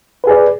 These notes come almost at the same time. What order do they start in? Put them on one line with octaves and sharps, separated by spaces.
B4 G#4 D5